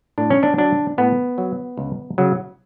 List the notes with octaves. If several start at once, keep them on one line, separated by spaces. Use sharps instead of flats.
A2 D4
C#4
D4
F#3 D4
A2 B3
F#3
C#2
C#3 F#3